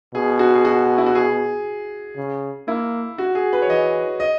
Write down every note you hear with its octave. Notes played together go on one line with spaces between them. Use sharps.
B2 G#4
F#4
G#4
F#4
E4
F#4
G#4
C#3
A#3 E4
F#4
G#4
B4
C#5
E3 D#5
D#5